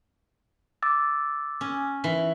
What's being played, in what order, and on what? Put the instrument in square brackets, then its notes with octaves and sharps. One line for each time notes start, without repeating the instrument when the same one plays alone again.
[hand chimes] D6 E6 A6
[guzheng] C#4
E3